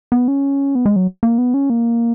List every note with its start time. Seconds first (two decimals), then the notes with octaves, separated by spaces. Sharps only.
0.12 B3
0.28 C#4
0.75 B3
0.86 G#3
0.96 F#3
1.23 A#3
1.38 B3
1.54 C#4
1.70 A#3